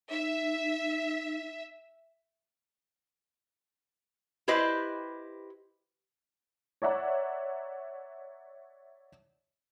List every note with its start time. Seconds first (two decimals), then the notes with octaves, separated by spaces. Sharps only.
0.11 D#4 E5
4.48 E4 G4 B4 C5 D#5
6.82 C#5 D5 E5 F#5 A#5